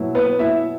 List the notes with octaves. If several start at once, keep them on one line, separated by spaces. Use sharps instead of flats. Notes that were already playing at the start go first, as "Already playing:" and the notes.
Already playing: B2 F#3 E4
B3 B4
E4 E5